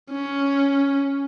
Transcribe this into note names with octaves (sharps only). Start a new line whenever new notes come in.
C#4